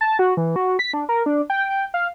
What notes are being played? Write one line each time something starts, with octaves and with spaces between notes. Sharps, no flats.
A5
F#4
E3
F#4
B6
D4
A#4
D4
G5
F5